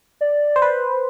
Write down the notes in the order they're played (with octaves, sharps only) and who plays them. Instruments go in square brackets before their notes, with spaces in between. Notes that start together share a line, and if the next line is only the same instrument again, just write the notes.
[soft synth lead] D5
[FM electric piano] C5
B4